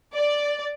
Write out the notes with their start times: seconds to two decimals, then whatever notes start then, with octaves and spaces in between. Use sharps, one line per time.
0.14 D5